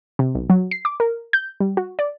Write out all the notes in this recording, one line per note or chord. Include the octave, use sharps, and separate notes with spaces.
C3
B1
F#3
C7
D6
A#4
G6
G3
F#4
D5